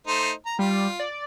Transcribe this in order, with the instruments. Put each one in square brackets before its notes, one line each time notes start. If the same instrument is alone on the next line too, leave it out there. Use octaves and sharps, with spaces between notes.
[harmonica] A3 D#4 C5
A#5
[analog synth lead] G3 [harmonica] F4
[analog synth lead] D5